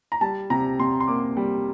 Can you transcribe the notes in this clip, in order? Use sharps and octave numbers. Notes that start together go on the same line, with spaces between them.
A#5
G3 A5
C3 A#5
C3 C6
C6
A#3 D6
G3